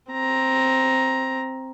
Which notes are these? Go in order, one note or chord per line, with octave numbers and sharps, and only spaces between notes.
C4 A#5